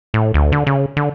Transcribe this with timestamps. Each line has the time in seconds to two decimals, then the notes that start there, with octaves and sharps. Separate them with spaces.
0.14 A2
0.34 D2
0.52 D3
0.67 C#3
0.97 D3